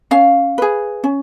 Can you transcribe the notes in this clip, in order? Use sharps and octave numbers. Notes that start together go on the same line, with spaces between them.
C#4 F5
G#4 B4
C#4